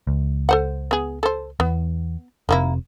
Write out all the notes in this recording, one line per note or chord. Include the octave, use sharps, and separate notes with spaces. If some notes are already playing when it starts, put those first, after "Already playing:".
C#2
A4 C5 F#5
B3 G#4
A4 C5
E2 B3
F1 C3 D#3 A#3 E4